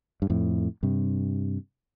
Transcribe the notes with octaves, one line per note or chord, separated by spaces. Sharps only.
G2
F2 A2
G2 C3